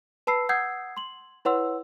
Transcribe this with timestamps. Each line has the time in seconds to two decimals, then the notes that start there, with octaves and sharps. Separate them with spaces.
0.27 B4 A5 B5 E6 C7
0.49 F#5 D#6 E6 G6 G#6 C7
0.97 C6 F#7
1.45 E4 B4 C#5 F#5 C6 E6